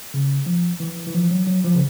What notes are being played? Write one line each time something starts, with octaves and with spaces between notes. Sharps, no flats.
C#3
F3
E3
E3
F3
F#3
F#3
F3
C#3